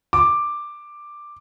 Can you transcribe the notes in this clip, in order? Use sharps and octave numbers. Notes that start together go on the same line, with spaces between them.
D6